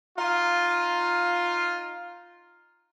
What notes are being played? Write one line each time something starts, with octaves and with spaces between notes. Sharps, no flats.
D#4 F4